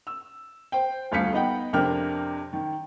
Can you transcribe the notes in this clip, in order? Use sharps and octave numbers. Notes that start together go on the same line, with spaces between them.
E6
C5 G5
D#1 D2 F5 B6 C#7
B3 D#4 D#5 F#5 G5
F2 C3 D4 A#4 G5 F6
D#3